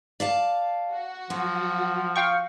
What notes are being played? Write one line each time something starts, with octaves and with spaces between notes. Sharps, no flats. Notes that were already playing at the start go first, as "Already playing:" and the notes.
D5 F5 A5
F#4
F3 F#3
F5 G5 C#6